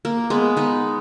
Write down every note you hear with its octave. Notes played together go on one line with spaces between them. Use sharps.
A#3
G#3 B3
B3 D#4